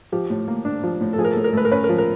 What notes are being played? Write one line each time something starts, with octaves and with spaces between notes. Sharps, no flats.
F3 G4
A2
A#3
D4
F3
A2
A4
F3 G#4
A#4
A4
A2
A#4
A3 B4
A#4
C#4 B4
A#4
F3
A#4